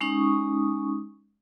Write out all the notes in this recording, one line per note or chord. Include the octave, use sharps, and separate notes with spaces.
G#3 C#4 D#4 C#6 D#6